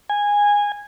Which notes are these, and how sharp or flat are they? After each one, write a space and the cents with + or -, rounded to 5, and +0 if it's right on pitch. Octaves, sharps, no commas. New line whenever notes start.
G#5 -15